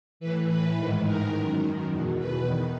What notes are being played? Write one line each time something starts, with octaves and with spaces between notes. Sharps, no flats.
A2 E3 B4
B4
G#2 D#3
A#4
F#2 D#3
E2 B2
B4
D#3